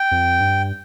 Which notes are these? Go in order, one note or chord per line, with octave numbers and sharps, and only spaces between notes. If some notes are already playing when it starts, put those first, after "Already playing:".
Already playing: G5
F2
G2